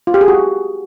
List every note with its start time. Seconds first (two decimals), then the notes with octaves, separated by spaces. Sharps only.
0.07 F4
0.14 G4
0.21 G#4
0.28 F#4